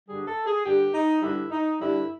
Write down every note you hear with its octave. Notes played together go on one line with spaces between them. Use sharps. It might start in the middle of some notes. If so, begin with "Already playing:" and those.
G2 D3 G3 G#4
A4
G#4
G2 D3 G3 G4
D#4
G2 D3 G3 E4
D#4
G2 D3 G3 E4